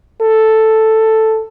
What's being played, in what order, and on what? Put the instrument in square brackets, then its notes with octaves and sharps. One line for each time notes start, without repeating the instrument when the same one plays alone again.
[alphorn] A4